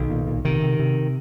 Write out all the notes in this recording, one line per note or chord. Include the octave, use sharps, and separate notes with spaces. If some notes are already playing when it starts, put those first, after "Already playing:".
Already playing: B1 D#3
A#2
A#2
C3 D#3
C3
C3